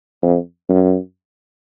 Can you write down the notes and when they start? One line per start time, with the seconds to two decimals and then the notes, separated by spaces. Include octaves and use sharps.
0.22 F2
0.69 F#2